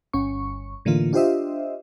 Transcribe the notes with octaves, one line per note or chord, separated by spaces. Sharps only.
G1 C#4 C#6
A2 D3 E3 A#3 F4
D4 F4 G4 C5 D#5 E5